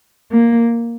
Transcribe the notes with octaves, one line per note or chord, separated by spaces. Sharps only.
A#3